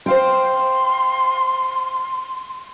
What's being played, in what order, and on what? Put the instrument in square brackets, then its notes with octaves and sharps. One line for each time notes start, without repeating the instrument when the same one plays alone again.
[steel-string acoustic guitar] C5 F5 G5 [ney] C6